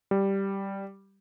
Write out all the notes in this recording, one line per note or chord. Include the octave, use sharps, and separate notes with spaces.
G3